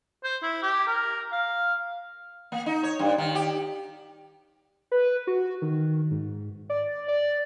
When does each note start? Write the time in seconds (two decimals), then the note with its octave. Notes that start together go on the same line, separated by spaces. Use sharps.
0.24 C5
0.43 E4
0.62 G4
0.87 A#4
1.32 F5
2.52 A#3
2.66 D#4
2.83 C#5
2.99 G2
3.18 D#3
3.35 G4
4.92 B4
5.27 F#4
5.62 D#3
6.11 G#2
6.70 D5
7.08 D5